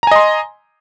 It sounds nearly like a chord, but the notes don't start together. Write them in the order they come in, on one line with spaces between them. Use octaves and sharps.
A#5 G#5 D#5 C6